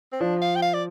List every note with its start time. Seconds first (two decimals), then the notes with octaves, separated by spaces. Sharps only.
0.13 C4
0.21 F3 D4
0.42 F5
0.56 G5
0.62 F5
0.74 D5